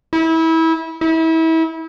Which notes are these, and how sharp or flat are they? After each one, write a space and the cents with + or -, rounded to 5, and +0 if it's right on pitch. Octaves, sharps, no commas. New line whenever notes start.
E4 -25
E4 -30